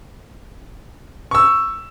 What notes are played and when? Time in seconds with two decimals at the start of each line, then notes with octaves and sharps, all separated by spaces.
1.31 C#6 E6